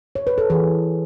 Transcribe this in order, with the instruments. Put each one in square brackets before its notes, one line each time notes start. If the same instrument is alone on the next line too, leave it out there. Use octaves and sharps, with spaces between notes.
[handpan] C#5
B4
A4
E3 G#4